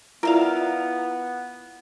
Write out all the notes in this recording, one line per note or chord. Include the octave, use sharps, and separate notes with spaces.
B3 E4 F4 A#4 D5 E5 F5